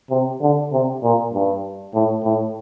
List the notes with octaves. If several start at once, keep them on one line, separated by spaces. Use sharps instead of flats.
C3
D3
C3
A#2
G2
A2
A2